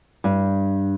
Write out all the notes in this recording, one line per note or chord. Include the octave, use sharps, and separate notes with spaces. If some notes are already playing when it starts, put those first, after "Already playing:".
G2